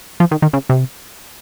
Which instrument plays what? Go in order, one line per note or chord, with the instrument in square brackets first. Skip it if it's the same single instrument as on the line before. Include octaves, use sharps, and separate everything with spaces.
[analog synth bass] F3
D#3
D#3
C#3
C3